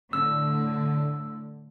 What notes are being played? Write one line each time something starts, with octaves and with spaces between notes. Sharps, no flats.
A2 D3 E6